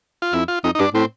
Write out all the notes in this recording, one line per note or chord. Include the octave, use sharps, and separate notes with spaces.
F4
F2 E4
F4
F2 D#4
D#4
G2 D4
A2 C4